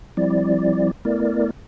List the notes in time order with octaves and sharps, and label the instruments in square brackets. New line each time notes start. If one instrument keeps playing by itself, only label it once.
[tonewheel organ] F3 G3 C4 E4 D5
A3 B3 E4 A#4 D5